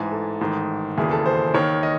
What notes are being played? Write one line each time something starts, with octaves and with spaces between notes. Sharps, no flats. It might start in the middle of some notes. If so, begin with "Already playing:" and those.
Already playing: A1 G#2 E3 G#5
A4
A1 G#2 D#3
E1 D#2 C#3 E3 G#4
A4
C5
D#2 D#3 C#5
D#5